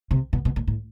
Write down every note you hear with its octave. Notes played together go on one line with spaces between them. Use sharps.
C3
B2
B2
A#2
A2